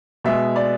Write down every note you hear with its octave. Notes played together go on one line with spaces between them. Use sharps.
B2 G#3 E5
D5